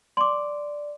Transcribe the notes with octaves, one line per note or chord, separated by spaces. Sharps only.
D5 C6 D6